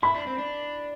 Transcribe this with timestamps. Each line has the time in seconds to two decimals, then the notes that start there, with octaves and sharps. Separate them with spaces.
0.02 E4 B5
0.15 D4
0.27 C4
0.38 D4